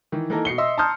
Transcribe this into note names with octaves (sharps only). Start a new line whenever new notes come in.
D#3 E3
E3 A#3 D#4 A4 A#4
B2 C7 C#7 G7
D#5 E5 C6 E6
A5 A#5 C6 D#6 F6 G6